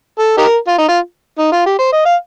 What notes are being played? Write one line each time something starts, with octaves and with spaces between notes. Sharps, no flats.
A4
D#4 G4 A#4
F4
D#4
F4
D#4
F4
G4
C5
D#5
F5